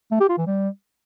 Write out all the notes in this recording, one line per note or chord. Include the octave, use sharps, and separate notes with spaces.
A3
G4
F4
E3
G3